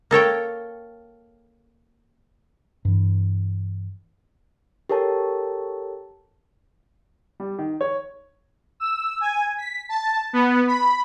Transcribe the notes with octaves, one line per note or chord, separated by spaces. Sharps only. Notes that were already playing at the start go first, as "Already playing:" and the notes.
A#3 A4 C#5 G5
G2 E3
G4 A4 A#4 C#5 A5
G3
D#3
C#5
E6
G#5
B6
A5
B3
B5